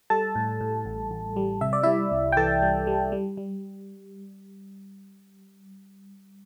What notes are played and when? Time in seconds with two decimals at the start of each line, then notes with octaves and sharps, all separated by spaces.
0.10 G3 A4 A5
0.35 A2
0.61 A2
0.86 A1
1.11 A1
1.36 G3
1.61 C3 E5
1.73 D5
1.83 G3 E4 E5
2.12 C2
2.32 G5
2.37 E3 A4 A5
2.62 G3
2.87 G3
3.12 G3
3.37 G3